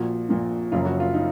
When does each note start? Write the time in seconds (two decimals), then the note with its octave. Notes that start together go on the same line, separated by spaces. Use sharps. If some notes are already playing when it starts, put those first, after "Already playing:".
Already playing: A#1 A#2 F3 F#4
0.29 A#1 A#2 F3
0.72 F#1 F#2 C#3 F3 F4
0.85 F#4
1.00 F4
1.14 D#4